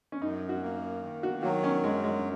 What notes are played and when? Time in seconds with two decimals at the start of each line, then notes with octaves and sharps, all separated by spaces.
0.12 C#4
0.22 F#2 D#4
0.49 F#4
0.63 A#3
1.02 D#3
1.23 F#4
1.43 F#3 F#4
1.64 C#4
1.83 F#2 G#3
2.04 G#3